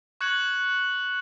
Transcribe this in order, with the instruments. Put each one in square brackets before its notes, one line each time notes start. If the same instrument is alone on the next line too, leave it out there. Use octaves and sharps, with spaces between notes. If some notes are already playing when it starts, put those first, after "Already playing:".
[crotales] C#6 F#6 G#6 C#7 F#7